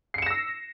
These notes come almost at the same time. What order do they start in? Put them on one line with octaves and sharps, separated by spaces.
C7 C#7 E7 A#6 E6